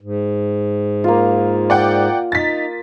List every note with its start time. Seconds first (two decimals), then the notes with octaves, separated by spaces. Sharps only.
0.01 G#2
1.04 A#3 F4
1.70 D5 F#5 G5
2.32 D#4 A6 B6